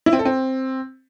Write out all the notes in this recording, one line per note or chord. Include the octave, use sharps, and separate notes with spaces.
E4
C4
A4
C4